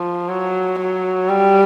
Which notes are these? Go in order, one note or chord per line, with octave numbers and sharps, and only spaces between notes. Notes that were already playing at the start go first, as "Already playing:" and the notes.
Already playing: F3
F#3
F#3
G3